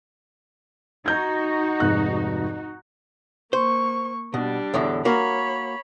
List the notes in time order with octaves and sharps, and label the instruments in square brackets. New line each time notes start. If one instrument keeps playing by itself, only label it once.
[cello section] D#4 F#4 [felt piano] A#5 G6 G#6
[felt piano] F1 G#2 F#6
[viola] A#3 C#6 [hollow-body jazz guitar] C5
[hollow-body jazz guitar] B2 [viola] G3 D4
[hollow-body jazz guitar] E2 A2 D3
[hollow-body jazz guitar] A#3 F#4 A#4 [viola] C#5 B5